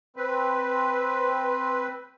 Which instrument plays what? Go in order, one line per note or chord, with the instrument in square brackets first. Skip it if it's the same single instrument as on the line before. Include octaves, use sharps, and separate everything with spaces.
[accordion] C4 B4